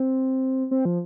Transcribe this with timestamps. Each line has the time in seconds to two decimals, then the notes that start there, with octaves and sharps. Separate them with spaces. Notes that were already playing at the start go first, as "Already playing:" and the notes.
Already playing: C4
0.71 C4
0.85 F3